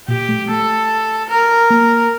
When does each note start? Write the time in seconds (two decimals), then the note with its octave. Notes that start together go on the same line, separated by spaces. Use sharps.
0.08 A#2 G4
0.29 A3
0.49 A3 A4
1.29 A#4
1.70 A#3